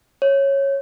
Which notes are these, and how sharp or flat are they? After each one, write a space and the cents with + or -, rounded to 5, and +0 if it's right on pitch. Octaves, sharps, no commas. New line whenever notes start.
C#5 -10